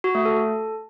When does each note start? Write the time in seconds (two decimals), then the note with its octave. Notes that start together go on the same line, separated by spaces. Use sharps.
0.04 F#4
0.15 A3
0.25 A4